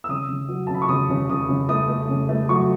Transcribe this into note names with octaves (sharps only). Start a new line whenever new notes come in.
E6
C#3 D#6
C#3
F#3
C#3 A5
B5
C#6
C#3 D#6
C#3
C#3 D#6
C#3
A3 D#6
A3
C#3
A3
F#3 C#6